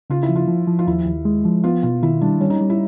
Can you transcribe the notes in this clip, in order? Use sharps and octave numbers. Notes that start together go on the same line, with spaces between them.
C#3 F4
E4
F3
F4
F3
F3
F4
D#2 E4
D#2
G#3
F3
B3 F4
B2 F4
D#3 E4
G3 D4
G3 C#4
D#4
G3
E4